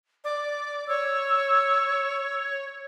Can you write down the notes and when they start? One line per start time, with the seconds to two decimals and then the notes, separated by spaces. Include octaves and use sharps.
0.24 D5
0.88 C#5 E6